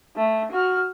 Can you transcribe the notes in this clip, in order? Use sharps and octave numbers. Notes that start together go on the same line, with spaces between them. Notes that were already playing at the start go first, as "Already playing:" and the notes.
A3
F#4 F6